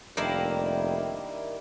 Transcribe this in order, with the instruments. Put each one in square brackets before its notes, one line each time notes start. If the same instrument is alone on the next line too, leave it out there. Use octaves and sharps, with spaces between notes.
[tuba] F1 [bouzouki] D#3 A#3 E4 [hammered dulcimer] G3 D4 E5